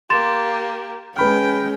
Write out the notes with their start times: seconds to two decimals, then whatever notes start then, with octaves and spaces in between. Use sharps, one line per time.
0.10 A#3 G4 C6 A6 E7
1.16 G#3 C#4 B4 G5 B5 F6